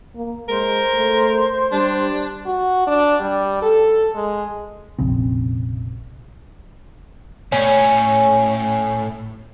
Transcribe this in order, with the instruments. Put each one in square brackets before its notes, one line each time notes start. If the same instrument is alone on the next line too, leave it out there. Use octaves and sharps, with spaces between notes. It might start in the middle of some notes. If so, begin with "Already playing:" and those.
[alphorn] A#3
[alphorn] G#3 [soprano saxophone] A#4 [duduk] C5
[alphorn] A3
[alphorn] G3 [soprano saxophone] D4
[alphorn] F#4
D4
G3
A4
G#3
[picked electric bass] F1 A#1 C#3 C4
[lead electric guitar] A2 [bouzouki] C#4